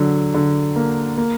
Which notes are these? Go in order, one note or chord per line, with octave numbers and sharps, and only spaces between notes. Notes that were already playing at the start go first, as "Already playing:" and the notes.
Already playing: D3 F#3
D3
A#3
A#3